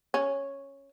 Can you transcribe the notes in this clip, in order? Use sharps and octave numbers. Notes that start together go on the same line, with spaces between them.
C#4